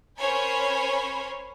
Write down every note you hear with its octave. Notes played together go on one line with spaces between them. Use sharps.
C#4 A#4 C5 C#5 G#5 B5